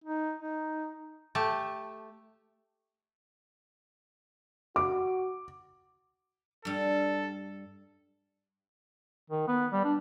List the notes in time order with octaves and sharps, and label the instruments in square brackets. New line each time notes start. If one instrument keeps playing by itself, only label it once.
[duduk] D#4
D#4
[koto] A3 G4 A5
[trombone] F#4 [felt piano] D6
[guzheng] G2 G3 [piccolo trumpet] A4
[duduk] D#3
B3
G3
D4